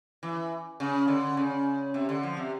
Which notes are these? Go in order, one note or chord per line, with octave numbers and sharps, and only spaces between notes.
E3
C#3
D3
C#3
C3
D3
F3
C3